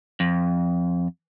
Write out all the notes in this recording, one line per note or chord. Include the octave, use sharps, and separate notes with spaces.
F2